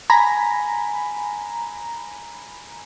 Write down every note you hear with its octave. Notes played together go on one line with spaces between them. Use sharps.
G#5 A#5 B5